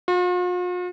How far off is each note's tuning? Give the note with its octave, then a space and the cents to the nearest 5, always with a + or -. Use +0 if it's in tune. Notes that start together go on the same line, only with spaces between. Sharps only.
F4 +45